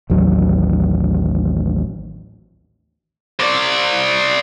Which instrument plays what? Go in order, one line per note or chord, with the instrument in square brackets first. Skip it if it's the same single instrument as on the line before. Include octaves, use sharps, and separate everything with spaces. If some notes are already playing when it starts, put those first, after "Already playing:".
[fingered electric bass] A1 D#2 F#3
[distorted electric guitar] C5 D5